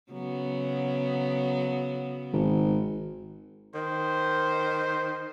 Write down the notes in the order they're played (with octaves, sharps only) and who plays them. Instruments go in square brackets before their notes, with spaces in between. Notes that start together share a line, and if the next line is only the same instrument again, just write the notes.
[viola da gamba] C#3 F#3 B3
[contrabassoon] G#1
[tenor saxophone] D#3 [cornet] C5